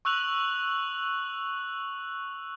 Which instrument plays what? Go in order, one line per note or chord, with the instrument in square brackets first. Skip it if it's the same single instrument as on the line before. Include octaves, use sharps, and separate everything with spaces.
[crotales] C#6 E6 F#6 F7 F#7